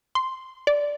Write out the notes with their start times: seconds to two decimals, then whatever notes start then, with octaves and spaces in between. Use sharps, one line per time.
0.15 C6
0.67 D5